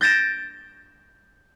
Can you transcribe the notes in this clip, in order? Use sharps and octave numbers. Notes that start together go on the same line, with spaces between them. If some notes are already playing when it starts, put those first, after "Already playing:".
G6 A6 A#6 D7 E7